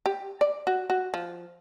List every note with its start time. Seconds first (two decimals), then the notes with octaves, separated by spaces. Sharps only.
0.06 G4
0.41 D5
0.67 F#4
0.90 F#4
1.14 F3